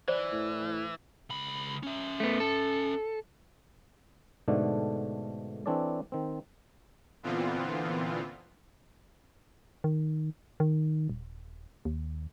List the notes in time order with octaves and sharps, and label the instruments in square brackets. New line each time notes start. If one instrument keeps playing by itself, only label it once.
[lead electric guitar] E3 [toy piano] C5 [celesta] D5
[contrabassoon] A2
[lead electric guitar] C#2 B5
C#4 E5
[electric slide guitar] A3 B3
A4
[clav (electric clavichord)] G#2 B2 D3 A3 D4
E3 C4 D4 A4 C#5 D5
D#3 C4
[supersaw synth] A#2 D3 E3 B3 C4 F4
[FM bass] D#3
D#3
D#1
D#2